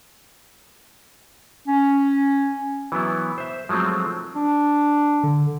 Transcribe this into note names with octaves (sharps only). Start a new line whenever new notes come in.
C#4
E3 F#3 B3 E4
C5 E5
F3 F#3 G#3 A3 C4
D4
D3